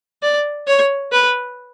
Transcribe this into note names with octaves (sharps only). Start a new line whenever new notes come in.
D5
C#5
B4